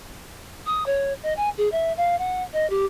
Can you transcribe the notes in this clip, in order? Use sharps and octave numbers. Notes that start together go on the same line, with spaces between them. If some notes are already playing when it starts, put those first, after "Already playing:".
D#6
C#5
D#5
G#5
G#4
E5
F5
F#5
D#5
G4